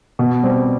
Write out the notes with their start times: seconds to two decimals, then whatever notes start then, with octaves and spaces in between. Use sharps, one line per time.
0.19 B2
0.43 G3 C4